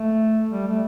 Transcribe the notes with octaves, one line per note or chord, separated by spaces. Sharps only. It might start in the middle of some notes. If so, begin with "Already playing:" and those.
Already playing: A3
G3
A3